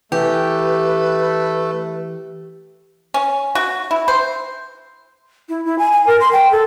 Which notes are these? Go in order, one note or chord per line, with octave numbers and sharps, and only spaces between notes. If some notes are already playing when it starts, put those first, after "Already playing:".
E3 A3 G4 B4
C#4
F#4
E4
C5
E4
E4
G#5
G#5
A#4
C6
G5
A4